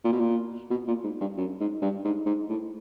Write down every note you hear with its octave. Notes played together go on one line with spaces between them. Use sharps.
A#2
B2
A#2
B2
A#2
G#2
G2
F#2
G#2
G2
G#2
G#2
A2